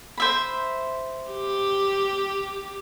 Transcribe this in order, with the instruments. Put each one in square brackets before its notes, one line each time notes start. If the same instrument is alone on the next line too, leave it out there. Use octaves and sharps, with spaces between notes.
[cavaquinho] C5 E5 B5
[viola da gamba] G4